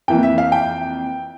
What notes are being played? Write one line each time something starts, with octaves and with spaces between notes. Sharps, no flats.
F2 E3 A#3 G5
E5
F5
G5